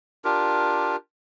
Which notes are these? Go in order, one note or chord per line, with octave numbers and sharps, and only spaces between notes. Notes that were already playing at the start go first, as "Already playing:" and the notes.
D4 F4 G4 A#4